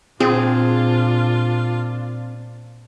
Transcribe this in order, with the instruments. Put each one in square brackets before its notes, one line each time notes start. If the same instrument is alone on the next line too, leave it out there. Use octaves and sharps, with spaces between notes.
[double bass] A#2 D4 [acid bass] C4 [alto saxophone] F4 [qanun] G#4